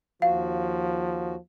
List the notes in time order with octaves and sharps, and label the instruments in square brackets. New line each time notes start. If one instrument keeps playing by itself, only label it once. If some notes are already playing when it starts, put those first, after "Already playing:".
[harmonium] D#2 F#4 [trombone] F3 [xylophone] F5